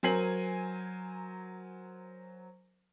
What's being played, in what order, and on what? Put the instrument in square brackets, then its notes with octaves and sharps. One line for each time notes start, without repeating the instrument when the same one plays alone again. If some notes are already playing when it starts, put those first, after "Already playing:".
[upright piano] F#3 A#4 C5 G#5 C7 F#7